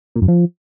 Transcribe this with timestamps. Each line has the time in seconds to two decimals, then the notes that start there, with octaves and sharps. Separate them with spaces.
0.16 A#2
0.22 F#2
0.28 F3